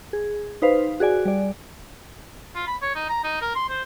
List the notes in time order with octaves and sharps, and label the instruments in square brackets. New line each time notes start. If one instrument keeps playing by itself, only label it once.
[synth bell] G#4
D#4 B4 C5 F5
F#4 G#4 D5 G#5
G3 D5
[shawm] F4
B5
C#5
D#4
A#5
D#4
A#4
C6
C5